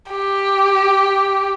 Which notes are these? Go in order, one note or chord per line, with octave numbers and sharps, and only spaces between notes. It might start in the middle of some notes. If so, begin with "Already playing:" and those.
G4